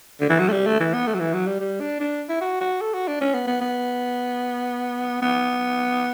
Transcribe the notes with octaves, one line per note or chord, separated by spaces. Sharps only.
D3
E3
F#3
A3
G3
A3
E3
B3
A3
F#3
E3
F#3
G3
G3
D4
D4
E4
F#4
F#4
A4
F#4
D4
C#4
B3
B3
B3
B3